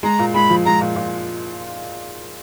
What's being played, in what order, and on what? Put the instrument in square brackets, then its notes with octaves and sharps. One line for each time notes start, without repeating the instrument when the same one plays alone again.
[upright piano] G#3 [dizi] A#5
[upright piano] A#2
[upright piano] G#3 [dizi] B5
[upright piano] F3
[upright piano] G#3 [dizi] A#5
[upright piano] A#2
A#2